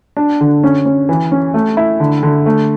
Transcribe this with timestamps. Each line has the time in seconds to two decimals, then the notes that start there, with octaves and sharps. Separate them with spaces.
0.17 D4
0.41 D3
0.63 C#4
0.85 C#4
1.09 E3
1.32 C#4
1.54 A3
1.77 E4
2.00 D3
2.23 D3
2.46 A3